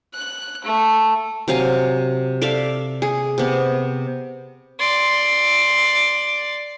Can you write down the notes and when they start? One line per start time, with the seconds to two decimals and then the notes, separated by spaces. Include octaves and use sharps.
0.14 F#6
0.65 A3
1.48 C3 F#3 F5 G#5
2.42 A4 D5 E5 F5
3.02 G#4
3.38 C3 B3
4.80 D5 C6